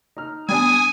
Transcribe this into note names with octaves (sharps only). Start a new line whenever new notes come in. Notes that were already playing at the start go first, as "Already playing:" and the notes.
D#4 F6
G3 B3 D4 G#5 D#6